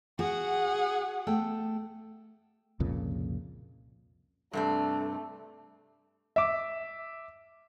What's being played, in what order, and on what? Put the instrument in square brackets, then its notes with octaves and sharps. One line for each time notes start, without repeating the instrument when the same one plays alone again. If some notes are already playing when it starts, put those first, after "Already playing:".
[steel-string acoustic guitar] F#4 [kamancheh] G#4 F#5
[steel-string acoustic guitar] A3 A4 G5
[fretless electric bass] C2 F2 A#2 C#3
[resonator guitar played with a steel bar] G2 C3 D4 [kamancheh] A3
[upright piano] E5 D6